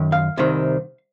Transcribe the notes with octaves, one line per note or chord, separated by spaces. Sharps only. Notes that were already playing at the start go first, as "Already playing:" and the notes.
Already playing: F#2 D#3
F5
C2 C3 D#3